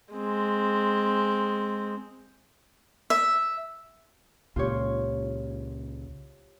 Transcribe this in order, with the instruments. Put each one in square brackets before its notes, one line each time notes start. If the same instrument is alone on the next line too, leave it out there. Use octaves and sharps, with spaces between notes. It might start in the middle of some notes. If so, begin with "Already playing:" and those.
[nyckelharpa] G#3 C4
[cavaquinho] E5
[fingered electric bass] C#2 A#2 [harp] F4 G4 C#5